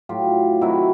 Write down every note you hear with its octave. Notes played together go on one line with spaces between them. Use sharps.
A2 F#3 F4 G4
C3 D#3 F#3 E4 F#4